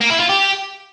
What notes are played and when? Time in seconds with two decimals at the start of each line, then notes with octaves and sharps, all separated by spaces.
0.01 A#3
0.10 E4
0.20 F4
0.29 G4